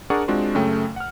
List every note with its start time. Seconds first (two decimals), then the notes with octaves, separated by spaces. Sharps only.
0.10 D4 G#4 A#4 D5 F#5 C#6
0.28 G#3 C4 D4 F4 F#4
0.55 F#2 C#3 A3 G5
0.96 F#5 F6